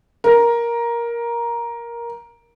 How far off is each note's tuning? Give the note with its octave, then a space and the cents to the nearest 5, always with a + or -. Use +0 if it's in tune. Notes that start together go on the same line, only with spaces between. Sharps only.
A#4 +10